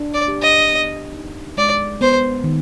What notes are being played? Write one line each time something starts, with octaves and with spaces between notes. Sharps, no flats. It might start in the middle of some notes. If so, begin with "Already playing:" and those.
Already playing: D4
D5
G4
D#5
B3
D#4
G#3 D5
B3 C5
D#3